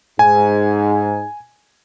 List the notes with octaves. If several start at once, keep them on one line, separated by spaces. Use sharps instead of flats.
G#2 G#5